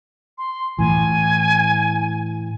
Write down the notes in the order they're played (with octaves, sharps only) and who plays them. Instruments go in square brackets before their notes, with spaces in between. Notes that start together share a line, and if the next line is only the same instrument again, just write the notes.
[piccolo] C6
[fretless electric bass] A2 E3 [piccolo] G#5